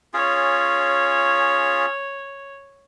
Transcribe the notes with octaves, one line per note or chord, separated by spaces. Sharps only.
C#4 F4 G#4 C#5